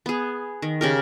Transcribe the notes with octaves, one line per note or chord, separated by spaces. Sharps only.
B3 G#4
D#3
C#3 G4 A#4